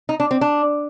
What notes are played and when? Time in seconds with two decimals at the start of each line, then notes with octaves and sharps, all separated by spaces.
0.09 D#4
0.20 D4
0.31 C4
0.41 D4